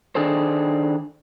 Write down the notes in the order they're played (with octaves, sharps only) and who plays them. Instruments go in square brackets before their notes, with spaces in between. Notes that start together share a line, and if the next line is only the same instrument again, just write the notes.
[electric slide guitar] D#3 D4 G#4 A4 C5